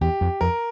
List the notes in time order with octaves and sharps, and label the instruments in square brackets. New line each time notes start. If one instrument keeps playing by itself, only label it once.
[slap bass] E2 [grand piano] G4
[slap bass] F2
[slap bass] F2 [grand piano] A#4